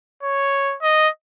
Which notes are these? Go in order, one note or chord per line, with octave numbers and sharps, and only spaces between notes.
C#5
D#5